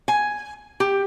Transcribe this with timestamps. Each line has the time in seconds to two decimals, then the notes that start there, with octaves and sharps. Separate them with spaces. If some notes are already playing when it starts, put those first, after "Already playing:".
0.08 G#5
0.80 G4